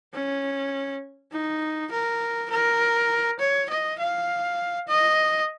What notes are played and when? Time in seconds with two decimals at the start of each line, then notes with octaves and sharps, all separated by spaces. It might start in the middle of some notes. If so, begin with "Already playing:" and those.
0.14 C#4
1.32 D#4
1.92 A#4
2.50 A#4
3.40 C#5
3.70 D#5
3.99 F5
4.88 D#5